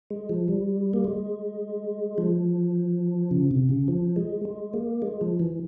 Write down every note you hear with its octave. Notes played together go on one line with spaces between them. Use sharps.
G#3
F3
G3
A#3
G#3
F3
C#3
C3
C#3
F3
G#3
G#3
A#3
G#3
F3
E3